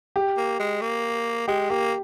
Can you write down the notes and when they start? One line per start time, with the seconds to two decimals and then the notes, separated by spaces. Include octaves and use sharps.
0.16 G4
0.37 A#3
0.59 G#3
0.82 A#3
1.48 G#3 G4
1.70 A#3 G4